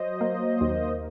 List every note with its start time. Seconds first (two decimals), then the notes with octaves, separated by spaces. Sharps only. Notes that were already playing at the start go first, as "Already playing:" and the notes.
Already playing: F#3 C5 D#5
0.21 A#3
0.61 D#2